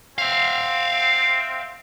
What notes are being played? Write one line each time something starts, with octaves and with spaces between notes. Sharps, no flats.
C4 E5 F5